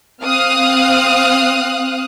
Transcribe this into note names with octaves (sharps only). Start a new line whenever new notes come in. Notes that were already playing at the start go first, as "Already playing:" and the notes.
C4 F5 D#6 F6 F#6